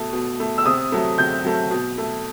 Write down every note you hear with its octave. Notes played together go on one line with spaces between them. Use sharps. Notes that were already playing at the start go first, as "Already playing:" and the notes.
Already playing: B2 A3
B2
A3
E6
C3 D#6
F#3 A3
C3 G6
F#3 A3
B2
A3